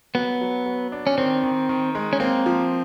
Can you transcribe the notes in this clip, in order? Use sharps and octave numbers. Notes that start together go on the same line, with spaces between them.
F#3 B3
F#3
F#3
D4
C#4
D#3 C4
D#3
D#3
G#3
C#4
A#3 C4
F3